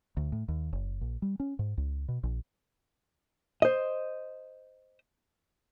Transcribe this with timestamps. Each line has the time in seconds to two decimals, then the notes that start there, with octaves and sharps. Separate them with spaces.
0.17 D2
0.32 A2
0.48 D#2
0.73 F#1
1.01 A#1
1.22 G3
1.40 C#4
1.59 G#2
1.77 C#2
2.08 B2
2.23 A#1
3.62 C5 D#5